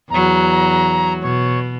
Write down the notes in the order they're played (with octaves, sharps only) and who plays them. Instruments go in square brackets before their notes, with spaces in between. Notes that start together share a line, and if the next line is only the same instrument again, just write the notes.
[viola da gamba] E2 F#3 [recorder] A#5
[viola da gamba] B2 [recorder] C#5